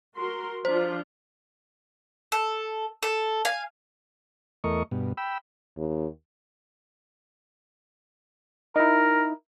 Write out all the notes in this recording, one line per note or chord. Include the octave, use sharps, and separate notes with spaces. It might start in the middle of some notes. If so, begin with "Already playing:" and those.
F#4 A#4 C6
F3 D4 F4 C5
A4
A4
F5 G#5
E2 A3 A#4 D#5 C#6
G2 B2
G5 B5 E6
D#2
D#4 E4 A#4